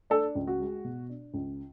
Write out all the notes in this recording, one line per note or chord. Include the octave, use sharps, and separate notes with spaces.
D4 A4
C#2
F#4
G#3
B2
D4
C#2